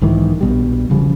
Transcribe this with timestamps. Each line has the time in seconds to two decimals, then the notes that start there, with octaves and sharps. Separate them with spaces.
0.01 B1 G#2 D#3 E3
0.41 A#1 B2 G3
0.90 E1 C#3 F3 G3